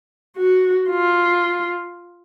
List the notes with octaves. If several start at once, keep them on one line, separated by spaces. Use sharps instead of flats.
F#4
F4